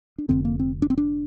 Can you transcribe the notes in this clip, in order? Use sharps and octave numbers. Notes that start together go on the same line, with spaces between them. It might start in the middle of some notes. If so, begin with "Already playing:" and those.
D4
F1 F2 D3 C4
A#3
C4
D4
C4
D4